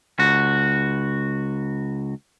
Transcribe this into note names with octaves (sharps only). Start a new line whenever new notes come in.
C#2 F#4